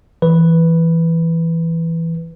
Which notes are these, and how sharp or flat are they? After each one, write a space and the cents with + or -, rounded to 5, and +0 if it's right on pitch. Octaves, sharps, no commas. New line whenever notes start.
E3 +5 B4 +0